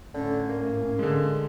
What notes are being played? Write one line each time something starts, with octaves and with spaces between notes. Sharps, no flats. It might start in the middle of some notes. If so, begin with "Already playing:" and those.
A2 D3 C#4
A#3
D3 G#3